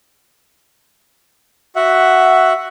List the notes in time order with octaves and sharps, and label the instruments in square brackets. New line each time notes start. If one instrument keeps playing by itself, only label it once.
[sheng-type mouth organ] F#4 E5 F#5